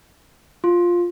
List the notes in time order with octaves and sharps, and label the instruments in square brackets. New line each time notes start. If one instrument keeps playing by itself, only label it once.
[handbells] F4